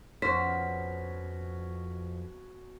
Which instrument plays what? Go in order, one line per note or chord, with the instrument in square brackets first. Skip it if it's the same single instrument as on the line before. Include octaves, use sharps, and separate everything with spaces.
[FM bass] F2 [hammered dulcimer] B2 C#4 [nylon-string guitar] C5 [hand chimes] B6